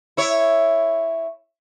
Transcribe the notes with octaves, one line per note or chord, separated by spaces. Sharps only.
E4 C#5